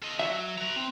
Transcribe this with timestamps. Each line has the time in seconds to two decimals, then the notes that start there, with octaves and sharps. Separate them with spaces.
0.03 A4 D#5
0.19 F#3 E5
0.58 B4 A#5
0.76 C4